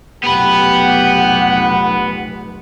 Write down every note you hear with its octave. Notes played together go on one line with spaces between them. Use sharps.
F1 B1 B3 G4 B4 F#5